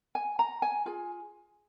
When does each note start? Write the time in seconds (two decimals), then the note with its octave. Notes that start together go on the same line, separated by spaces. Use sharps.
0.15 G#5
0.39 A#5
0.62 G#5
0.86 F4 G#4 G#5